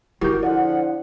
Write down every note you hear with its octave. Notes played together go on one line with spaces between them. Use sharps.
E4 F#4 G4 A#4 G6
D3 F3 D5 F#5